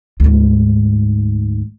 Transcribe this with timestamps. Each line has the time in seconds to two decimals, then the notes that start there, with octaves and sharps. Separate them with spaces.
0.20 D2 G#2